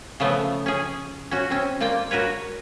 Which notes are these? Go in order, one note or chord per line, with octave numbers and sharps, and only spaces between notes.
C#3 F3 A3 B3
C#4 G#4
C#4 F#4
C4 C#4
A#3 F4 D5 G5
F#4 A#4 B4 C#5